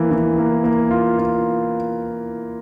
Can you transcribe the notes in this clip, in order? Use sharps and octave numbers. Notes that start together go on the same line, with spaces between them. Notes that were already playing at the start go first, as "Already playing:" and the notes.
Already playing: E3 A#3
E3
A#3
A#3
F4
F4